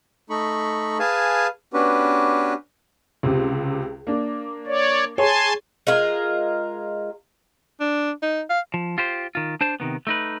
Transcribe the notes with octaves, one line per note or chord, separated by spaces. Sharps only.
A3 D#4 B5 C#6
G#4 B4 F5 G#5 A5
B3 C#4 D4 F#4 G4 B4
C#2 C3
A#3 D4
C#5 D5
G#4 C#5 G#5 A5 C6
G#3 F4 A#4
D4
D#4
F5
F3
F4 G4 C5
D#3 F4
D4 C5 A5
C3 D#3 B3
A3 D#4 B4